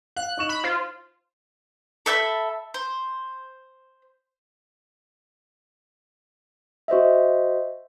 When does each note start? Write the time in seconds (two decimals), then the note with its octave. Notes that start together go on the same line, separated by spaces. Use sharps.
0.16 F5 F#6
0.37 D#4 C#6 E7
0.49 B5
0.64 F4 C5
2.06 A4 E5 G5 B5
2.74 C5
6.88 F#4 C5 D#5 E5